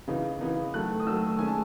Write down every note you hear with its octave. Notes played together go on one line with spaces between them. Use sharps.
C#3 E3 B3 D#4
C#3 E3 B3 D#4
D#3 F#3 A3 F#6
D#6
D#3 F#3 A3 E6
D#3 G#3 C#4 G#5
A5